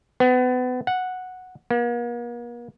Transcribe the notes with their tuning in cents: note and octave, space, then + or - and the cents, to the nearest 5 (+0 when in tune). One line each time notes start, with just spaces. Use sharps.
B3 +30
F#5 -5
A#3 +45